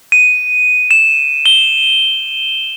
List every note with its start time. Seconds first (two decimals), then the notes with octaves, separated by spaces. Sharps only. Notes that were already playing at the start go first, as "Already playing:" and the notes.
0.12 D#7
0.91 E7
1.46 G7